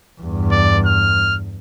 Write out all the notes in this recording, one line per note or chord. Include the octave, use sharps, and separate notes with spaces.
E2 G2
D5
F6